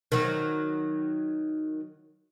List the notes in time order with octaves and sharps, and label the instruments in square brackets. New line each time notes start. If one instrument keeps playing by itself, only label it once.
[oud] D#3 F#3